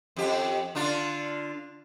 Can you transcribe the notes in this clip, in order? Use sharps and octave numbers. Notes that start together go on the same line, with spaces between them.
F2 G4
D3 D4 F4